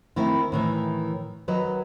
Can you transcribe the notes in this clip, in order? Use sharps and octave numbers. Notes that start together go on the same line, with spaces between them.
D#3 A3 C4 E4
A2 D#3 E3
D#3 F#3 B4 D#5